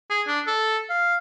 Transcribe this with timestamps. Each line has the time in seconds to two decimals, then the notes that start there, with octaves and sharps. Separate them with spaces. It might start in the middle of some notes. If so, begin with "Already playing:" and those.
0.10 G#4
0.27 D4
0.47 A4
0.90 F5